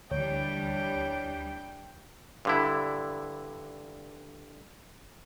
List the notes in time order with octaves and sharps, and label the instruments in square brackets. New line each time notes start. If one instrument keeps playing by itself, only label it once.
[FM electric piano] D2 C#5 [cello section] E3 G3 D4 [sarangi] G5
[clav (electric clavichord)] G2 D3 E4